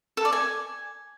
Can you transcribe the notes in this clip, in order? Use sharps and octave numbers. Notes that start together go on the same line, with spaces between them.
A4
D5
G#5